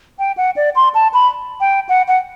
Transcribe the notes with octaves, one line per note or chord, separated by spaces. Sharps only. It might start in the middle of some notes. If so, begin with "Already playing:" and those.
G5
F#5
D5
C6
A5
B5
G5
F#5
F#5